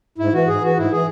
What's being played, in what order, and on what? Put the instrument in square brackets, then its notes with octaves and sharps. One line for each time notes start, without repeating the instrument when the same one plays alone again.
[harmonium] G#2 E4
E3 F#4
G#2 G#4
E3 F#4
G#2 E4
E3 G#4